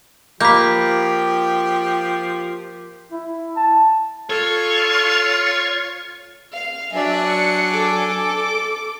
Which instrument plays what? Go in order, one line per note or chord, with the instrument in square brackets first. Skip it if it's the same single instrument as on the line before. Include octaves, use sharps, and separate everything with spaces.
[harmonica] F3 G4 [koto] A#3 [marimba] B5 D6 [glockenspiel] G6 B6
[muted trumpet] E4
A5
[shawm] F4 [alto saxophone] A4 [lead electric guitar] C#5
[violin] F5
[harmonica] F#3 D4 G#5 [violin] D5 E5
[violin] C#7
A4 D6